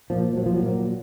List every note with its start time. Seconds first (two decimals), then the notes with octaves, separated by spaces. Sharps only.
0.10 A#2 F3
0.36 A#2 F#3
0.46 F3
0.56 F#3
0.63 A#2